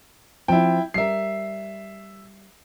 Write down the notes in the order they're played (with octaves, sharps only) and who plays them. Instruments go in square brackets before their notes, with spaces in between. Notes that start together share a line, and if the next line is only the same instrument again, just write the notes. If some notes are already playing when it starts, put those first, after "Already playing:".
[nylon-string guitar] F3 C4 [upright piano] E4 G5
[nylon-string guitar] G3 A#4 [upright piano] E5 C7